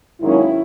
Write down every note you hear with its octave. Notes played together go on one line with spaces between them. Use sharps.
G#2 D#3 F#3 A#3 C#4 E4